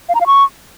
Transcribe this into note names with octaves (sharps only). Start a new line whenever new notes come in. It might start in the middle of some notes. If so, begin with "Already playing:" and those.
F5
A#5
F5
C#6